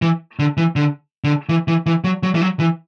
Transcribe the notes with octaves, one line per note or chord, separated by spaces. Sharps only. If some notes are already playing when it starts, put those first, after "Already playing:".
E3
D3
E3
D3
D3
E3
E3
E3
F#3
F#3
E3
F#3
E3